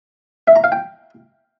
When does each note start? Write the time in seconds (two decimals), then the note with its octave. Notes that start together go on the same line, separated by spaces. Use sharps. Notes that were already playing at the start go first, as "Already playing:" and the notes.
0.48 E5
0.56 A#5
0.64 F5
0.72 G5